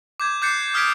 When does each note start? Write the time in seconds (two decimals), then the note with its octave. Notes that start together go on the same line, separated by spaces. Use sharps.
0.20 D6 G6 G#6
0.42 D6 F#6 G6 A6 C7 C#7
0.74 D#6 F6 G#6 B6 D7